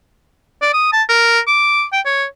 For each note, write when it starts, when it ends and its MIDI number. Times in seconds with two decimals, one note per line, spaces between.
0.62 0.69 74
0.73 0.91 87
0.93 1.03 81
1.09 1.40 70
1.47 1.84 86
1.93 2.01 79
2.05 2.25 73